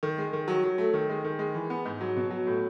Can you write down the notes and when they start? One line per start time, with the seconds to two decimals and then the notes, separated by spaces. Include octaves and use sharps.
0.03 D#3
0.18 G#3
0.33 D#3
0.48 F#3
0.64 F#3
0.78 A3
0.94 D#3
1.09 G#3
1.24 D#3
1.39 G#3
1.55 E3
1.70 B3
1.85 G#2
2.01 F#3
2.16 B2
2.30 F#3
2.47 A2